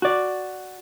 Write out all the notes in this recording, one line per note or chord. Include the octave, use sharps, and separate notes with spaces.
F#4 D5